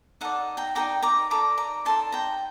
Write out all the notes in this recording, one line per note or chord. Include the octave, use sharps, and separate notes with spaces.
D#4 A4 D5 F#5
G5 A#5
D#4 A4 D5 G5 A#5
A#5 D6
D#4 A4 D5 A#5 D6
A#5 D6
D#4 A4 D5 A5 C6
G5 A#5